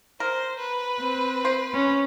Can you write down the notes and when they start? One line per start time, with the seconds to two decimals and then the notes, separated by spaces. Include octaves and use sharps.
0.20 A#4 C5
0.59 B4
1.00 C4
1.45 C5
1.74 C#4